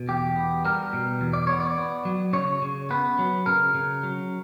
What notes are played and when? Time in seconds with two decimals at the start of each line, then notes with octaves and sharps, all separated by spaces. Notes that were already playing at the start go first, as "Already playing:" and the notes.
Already playing: B2
0.08 E2 G4
0.36 B3
0.65 G3 A#4
0.93 B2
1.21 E2
1.33 D5
1.47 B3 C#5
1.60 D5
1.78 B3
2.05 F#3
2.33 C#3 C#5
2.62 C#3
2.90 B3 B4
3.19 F#3
3.46 C#3 A#4
3.74 C#3
4.03 F#3